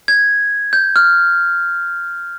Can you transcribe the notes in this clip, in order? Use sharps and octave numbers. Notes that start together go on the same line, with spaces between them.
G#6
G6
F6